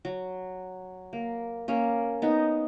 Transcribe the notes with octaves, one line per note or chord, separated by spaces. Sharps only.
F#3
A#3
A#3 C#4
B3 D#4